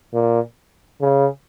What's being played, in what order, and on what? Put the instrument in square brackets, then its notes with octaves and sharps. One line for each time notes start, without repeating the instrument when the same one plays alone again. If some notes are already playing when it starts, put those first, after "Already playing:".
[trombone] A#2
C#3